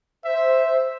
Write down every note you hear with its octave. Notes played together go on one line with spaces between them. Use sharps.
C5 E5